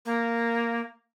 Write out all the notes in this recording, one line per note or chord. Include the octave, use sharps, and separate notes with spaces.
A#3